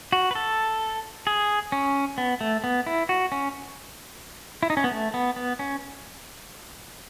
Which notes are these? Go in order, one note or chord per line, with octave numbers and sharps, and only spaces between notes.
F#4
B4
A4
G#4
C#4
B3
A3
B3
E4
F#4
C#4
E4
D#4
C#4
B3
A3
B3
B3
C#4